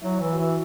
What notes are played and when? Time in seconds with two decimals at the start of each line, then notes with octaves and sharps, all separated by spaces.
0.02 F#3 E4
0.20 E3
0.33 F#4
0.39 E3 E4